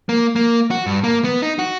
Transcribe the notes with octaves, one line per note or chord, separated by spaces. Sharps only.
A#3
A#3
F#4
G2
A#3
B3
D#4
F#4